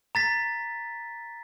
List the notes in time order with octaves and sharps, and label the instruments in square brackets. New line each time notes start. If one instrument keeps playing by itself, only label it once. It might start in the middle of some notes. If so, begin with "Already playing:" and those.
[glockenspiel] A#5 A6 B6